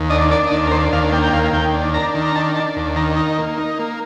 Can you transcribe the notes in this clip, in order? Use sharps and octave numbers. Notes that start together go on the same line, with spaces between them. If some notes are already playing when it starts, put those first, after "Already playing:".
Already playing: D#2
D4 D#5
D4 D5
D#5
D#2 D5
A#4
D4 C5
D#2 F5
A#3 G5
G5
D#2 F5
D#2 G5
D4
D4 A#5
D#3
A#5
D4 A5
D4 A5
D#2
D#3 A#5
D#4
A#3
D#4
A#3